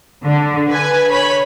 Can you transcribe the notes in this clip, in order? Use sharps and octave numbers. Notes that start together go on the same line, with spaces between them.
D3
B4 G#5
C#5 B5